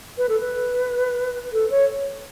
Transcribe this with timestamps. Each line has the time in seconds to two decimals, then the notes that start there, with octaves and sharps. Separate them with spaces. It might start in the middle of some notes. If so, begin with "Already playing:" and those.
0.18 B4
0.29 A4
0.40 B4
1.53 A4
1.70 C#5